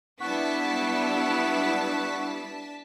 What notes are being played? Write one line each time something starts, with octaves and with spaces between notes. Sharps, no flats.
G3 B3 D4 E4 F#5 A5 C#6 B6